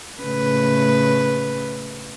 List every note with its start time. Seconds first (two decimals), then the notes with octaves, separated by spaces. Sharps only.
0.23 A2 C#3 B4